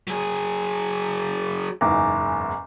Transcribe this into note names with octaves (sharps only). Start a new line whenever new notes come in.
F#3 G#4
F#1 E2 G#2 G#5 A#5 D6